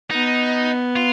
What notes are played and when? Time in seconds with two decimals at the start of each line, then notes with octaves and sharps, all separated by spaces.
0.11 B3 D#4
0.96 F4